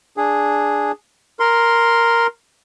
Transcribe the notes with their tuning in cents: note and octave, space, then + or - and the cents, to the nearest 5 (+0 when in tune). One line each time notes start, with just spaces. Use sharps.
D4 +0 G#4 +0
A#4 +0 C6 +0